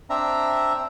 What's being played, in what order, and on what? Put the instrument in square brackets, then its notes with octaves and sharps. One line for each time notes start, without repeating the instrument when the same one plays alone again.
[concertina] C4 D4 E5 A#5